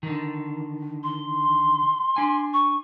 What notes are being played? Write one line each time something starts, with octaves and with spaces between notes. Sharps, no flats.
D3 D#3
C6
D4 G#5
C#6